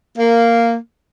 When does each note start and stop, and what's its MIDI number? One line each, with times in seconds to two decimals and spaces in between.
0.18 0.74 58